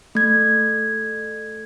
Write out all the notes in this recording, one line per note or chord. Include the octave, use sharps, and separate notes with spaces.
A3 G#6